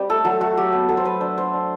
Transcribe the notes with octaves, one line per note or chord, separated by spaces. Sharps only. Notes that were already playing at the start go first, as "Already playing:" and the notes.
Already playing: G3 C4
A3 A4
F#3 A4
A3 F#4
F#3 G4
B3
F#3 A4
C5
F#3 B4
D4 C5
D4 C5
D4